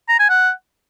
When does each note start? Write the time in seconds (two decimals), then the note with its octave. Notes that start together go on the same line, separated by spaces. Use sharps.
0.09 A#5
0.19 G#5
0.30 F#5